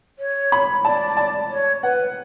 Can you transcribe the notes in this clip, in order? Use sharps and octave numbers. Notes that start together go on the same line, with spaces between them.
C#5
B5
D5 A5
A5
C#5
B4 F#5